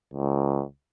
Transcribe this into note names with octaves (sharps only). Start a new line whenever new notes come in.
C#2